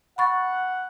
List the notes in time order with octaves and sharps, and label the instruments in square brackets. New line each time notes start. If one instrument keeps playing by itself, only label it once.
[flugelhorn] F#5 [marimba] B5 C#6 A6